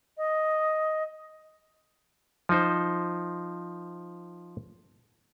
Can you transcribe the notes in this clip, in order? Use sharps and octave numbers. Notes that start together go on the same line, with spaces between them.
D#5
F3 D#4 C5